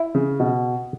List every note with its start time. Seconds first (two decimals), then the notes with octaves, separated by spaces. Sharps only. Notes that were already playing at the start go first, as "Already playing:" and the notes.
Already playing: E4
0.15 C#3
0.40 B2